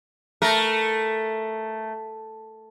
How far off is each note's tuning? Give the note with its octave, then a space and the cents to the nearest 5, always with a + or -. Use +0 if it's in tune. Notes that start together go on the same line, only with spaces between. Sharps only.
A3 +0 A#4 +10